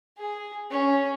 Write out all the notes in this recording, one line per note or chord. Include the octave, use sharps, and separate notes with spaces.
G#4
C#4